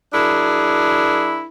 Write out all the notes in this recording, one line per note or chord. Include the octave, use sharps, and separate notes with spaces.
F#3 D4 E4 G#4 A#4